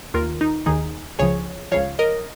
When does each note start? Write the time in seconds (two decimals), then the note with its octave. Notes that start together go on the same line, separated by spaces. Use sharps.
0.14 D#2 D#3 F4 A#4
0.41 D#4
0.66 D#2 D#3 D#4 G#4
1.19 C#2 C#3 F3 G#4 C#5
1.72 C#2 C#3 F3 C#5 F5
1.99 A#4 D#5